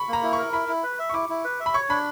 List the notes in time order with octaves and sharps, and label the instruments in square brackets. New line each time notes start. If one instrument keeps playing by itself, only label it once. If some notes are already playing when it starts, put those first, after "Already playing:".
Already playing: [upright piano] B5 C#6
[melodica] A#3 [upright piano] A#5
[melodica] E4
[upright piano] C#6
[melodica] A#4
[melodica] E4 [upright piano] B5
[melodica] E4
B4
E5
[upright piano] C#6
[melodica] E4 [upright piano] D6
[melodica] E4
B4
E5
[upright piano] B5
[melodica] C#5 [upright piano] C#6
[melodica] D4 [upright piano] B5